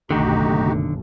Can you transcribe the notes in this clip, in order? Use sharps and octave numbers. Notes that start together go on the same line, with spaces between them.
F#1 B1 D3 D#3 A3 D#4 F#4 G4